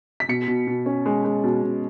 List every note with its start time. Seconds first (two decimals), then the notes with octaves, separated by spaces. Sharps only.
0.20 B6
0.29 B2 C#7
0.48 B2
0.67 B2
0.86 C#4
1.06 G#3
1.24 G#3
1.44 B2
1.63 B2